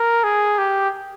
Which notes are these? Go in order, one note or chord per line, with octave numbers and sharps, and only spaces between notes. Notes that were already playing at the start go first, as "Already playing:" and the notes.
Already playing: A#4
G#4
G4